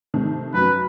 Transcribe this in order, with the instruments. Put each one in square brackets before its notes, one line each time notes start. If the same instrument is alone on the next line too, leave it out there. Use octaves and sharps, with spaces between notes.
[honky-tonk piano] C3 D#3 A3
[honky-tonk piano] F#2 [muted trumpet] B4